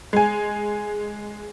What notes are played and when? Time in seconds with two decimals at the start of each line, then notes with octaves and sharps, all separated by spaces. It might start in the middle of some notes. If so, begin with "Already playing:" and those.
0.13 G#3 G#5